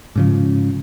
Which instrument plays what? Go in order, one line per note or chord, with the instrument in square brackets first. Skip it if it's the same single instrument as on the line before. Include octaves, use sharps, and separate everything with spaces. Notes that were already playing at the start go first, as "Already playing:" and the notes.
[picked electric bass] G#2 C#3 F3